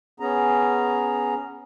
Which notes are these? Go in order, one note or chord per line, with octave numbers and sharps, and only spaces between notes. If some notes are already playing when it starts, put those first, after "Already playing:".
B3 C#4 G#4 A#5